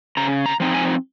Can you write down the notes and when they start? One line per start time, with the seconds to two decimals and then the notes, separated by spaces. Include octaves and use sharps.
0.17 C#3 A#5
0.46 A#5
0.60 F3 C4 D#4
0.74 G#5